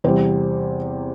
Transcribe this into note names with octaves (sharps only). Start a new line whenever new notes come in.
E2 C3 G3 C4 C5